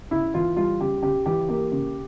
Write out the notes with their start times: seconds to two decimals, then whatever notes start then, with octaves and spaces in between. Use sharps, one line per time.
0.11 C#3 E4
0.34 E3 F4
0.56 G3 F4
0.80 C#3 G4
1.03 C#3 G4
1.26 E3 G4
1.49 A#3 G4
1.72 C#3